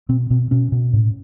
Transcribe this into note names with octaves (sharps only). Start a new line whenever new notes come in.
B2 C4
B2 C4
B2 C#4
B2
A2